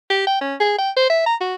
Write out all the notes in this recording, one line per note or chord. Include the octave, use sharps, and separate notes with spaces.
G4
G5
C#4
G#4
G5
C5
E5
A#5
F#4